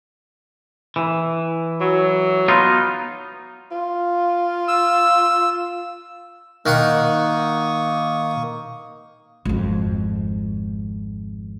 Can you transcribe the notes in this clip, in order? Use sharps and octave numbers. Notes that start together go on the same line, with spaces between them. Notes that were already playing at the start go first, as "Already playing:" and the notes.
E3
F#3
B3 D#4 F4
F4
E6
D#3 A#3 F#5 C#6 D#6
G#1 F2